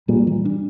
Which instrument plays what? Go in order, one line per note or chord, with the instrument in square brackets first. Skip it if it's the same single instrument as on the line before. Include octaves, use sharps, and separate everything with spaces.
[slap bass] A#2 [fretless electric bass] G3
[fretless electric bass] E3
D4